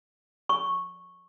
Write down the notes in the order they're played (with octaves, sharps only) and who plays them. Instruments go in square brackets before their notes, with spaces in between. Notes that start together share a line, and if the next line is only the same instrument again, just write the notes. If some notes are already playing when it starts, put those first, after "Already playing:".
[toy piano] C#6